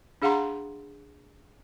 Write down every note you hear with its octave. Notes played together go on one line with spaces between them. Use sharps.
D4 G#4 F5 F#5 A#5 C6